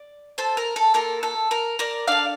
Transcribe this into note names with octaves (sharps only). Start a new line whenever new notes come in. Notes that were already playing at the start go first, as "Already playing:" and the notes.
Already playing: D5
A4 C5
A#4
A4
A#3 F4 A4 A#4
A4
A#4
A#4 D5
D4 A4 D5 F5